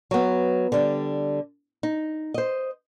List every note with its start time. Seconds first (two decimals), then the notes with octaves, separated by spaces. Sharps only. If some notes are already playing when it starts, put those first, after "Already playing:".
0.11 F#3 B3
0.72 D3 G3
1.83 D#4
2.34 C5 D#5